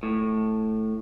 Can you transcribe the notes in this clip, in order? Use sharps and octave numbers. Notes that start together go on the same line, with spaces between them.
A2